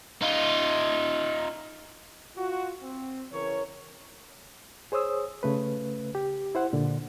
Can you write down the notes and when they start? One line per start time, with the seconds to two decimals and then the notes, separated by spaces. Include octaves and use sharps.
0.22 D#4 F4
2.36 F4 F#4
2.82 C4
3.32 C#3 E3 A#4 C#5
4.92 G#4 C5 C#5 D#6 E6
5.43 C#3 A3 B4
6.15 G4
6.55 E4 C5 F#5
6.73 A#2 D3